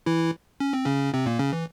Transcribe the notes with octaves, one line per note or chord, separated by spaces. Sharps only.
E3 E4
C#4
C4
C#3 C#4
C3 C4
A#2 A#3
C#3 C#4
E3